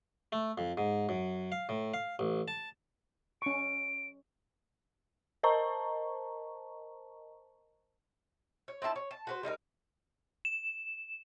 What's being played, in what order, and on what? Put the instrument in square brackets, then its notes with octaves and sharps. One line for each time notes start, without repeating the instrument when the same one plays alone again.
[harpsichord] A3
F2
G#2
F#2
F5
A2
F5
A1
A5
[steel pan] C#4 C#6 [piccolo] D7
[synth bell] A#4 C5 D#5 A5 A#5 C#6
[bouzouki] C#5
C4 D#4 E4 A5
C#5
A5
F#4 B4 C5
G3 D#4 E4 A#4
[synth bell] E7